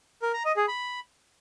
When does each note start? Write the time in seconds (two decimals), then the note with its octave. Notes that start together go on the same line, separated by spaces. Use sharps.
0.22 A#4
0.34 A#5
0.45 D#5
0.57 G#4
0.68 B5